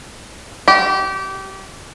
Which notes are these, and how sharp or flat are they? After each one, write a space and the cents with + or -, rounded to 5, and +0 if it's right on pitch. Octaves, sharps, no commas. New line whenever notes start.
G4 -25